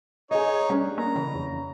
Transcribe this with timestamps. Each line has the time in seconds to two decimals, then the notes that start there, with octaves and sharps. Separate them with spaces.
0.31 D#4 G#4 C#5 D#5
0.70 G3 C#4 D4
0.98 A#3 A#5
1.16 C#3 E3
1.35 F2